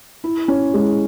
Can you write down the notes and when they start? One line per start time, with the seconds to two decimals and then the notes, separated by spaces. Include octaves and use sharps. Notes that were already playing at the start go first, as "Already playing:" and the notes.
0.24 E4
0.48 C#4
0.74 G#3